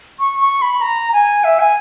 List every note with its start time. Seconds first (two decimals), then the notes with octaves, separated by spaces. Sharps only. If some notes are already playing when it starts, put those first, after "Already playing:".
0.20 C#6
0.41 C#6
0.62 B5
0.81 A#5
1.13 G#5
1.44 E5
1.59 G#5